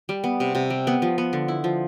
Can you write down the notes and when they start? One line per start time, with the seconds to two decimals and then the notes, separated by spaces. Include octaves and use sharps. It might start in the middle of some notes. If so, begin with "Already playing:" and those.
0.09 G3
0.24 B3
0.40 C3
0.55 C3
0.70 G3
0.87 B3
1.02 F3
1.18 B3
1.33 D3
1.48 E4
1.64 F3